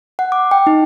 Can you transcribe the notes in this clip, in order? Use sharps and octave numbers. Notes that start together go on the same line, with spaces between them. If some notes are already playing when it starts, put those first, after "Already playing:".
F#5
D6
G5
D#4